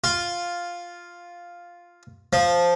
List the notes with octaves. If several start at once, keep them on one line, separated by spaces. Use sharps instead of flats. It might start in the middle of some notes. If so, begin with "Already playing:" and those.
F4
F3